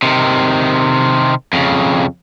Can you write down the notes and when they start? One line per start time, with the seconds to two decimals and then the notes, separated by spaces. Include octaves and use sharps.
0.03 C3 D#3
1.53 F2 C#3